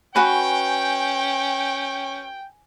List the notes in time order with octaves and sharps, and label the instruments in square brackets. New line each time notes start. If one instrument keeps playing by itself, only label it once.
[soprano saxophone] C#4 [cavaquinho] F#4 B4 [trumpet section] G5 [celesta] G#5